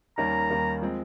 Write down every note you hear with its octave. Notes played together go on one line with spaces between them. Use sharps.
D#2 D#3 G3 A#3 C#4 A#5
D#2 D#3 G3 A#3 C#4
F3 G#3 C4